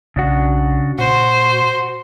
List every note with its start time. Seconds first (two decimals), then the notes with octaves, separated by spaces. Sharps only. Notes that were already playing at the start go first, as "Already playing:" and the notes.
0.16 B1 C#3 D4 F#4
0.99 A#2 F#4 C5